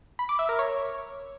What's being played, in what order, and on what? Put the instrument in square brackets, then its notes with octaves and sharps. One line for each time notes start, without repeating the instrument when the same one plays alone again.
[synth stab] B5
D6
E5
A#4
C#5